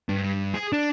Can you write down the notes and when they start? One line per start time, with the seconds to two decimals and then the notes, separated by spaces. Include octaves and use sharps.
0.09 G2
0.54 G#4
0.73 D4